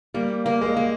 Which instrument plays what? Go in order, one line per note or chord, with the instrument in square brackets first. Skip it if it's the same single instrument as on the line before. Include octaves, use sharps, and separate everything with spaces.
[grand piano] G3 [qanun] A#3
[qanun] A#3
[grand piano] G#3
[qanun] A#3